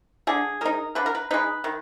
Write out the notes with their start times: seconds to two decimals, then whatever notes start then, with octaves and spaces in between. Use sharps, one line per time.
0.27 D3 G#4
0.61 G#3 D#4 A#4
0.95 D3 B4
1.06 A#4
1.15 B4
1.31 G#3 D#4 B4
1.64 D#3